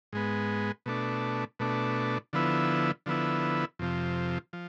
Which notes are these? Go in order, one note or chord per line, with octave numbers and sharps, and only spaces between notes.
G#2 G#3 B3
B2 A3 D4
B2 A3 D4
D3 F3 B3 E4
D3 F3 B3 E4
F2 C3 F3
F3